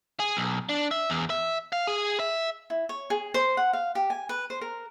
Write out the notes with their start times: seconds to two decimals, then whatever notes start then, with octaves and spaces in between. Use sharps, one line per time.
0.20 G#4
0.37 B1
0.69 D4
0.91 E5
1.10 E2
1.30 E5
1.73 F5
1.87 G#4
2.20 E5
2.70 E4
2.89 C#5
3.10 G#4
3.34 C5
3.57 F#5
3.73 F5
3.95 G4
4.10 G#5
4.29 B4
4.50 C5
4.61 A#4